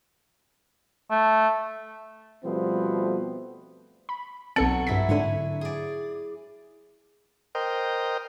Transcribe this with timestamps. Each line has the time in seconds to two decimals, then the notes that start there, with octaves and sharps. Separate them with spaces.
1.11 A3
2.45 B2 F3 G3 A3 B3 C4
4.09 B5
4.56 B1 F#3 C4 A4 C#7
4.87 G2 F#3 E4 B6
5.09 G#2 D3 C#5 F#5 G#5
5.61 G#4 D5
7.55 A#4 C5 D#5 G5